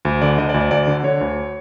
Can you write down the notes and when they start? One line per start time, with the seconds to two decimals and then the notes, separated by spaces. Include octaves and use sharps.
0.05 D2
0.22 D3 D5
0.38 D2 D#5
0.49 D5
0.54 D2
0.60 D5
0.71 D2 D5
0.87 D3
1.04 D3 C#5
1.21 D2